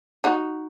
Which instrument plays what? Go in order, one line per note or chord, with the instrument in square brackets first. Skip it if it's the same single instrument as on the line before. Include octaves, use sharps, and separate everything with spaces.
[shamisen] D#4 F#4